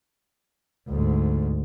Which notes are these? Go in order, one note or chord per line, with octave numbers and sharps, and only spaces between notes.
D2 G#2